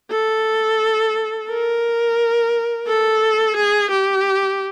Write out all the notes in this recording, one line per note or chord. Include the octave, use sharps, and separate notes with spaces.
A4
A#4
A4
G#4
G4